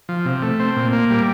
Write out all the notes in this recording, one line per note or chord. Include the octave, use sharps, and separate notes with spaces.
F3
C3
A3
C4
A#2
A#3
G3